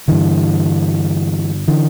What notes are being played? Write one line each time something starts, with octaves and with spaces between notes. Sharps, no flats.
G2 D3 E3
D3 E3